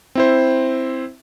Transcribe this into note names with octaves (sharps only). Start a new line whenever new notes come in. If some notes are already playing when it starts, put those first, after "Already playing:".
C4 E4 C5